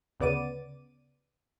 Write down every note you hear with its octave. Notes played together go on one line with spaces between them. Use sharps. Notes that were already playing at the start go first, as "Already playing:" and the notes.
D2 C#3 B3 D5 D6 D#7